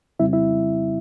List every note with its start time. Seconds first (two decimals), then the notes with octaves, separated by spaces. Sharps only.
0.19 F2 C#3 G3 C4 E4 E5
0.33 E4 E5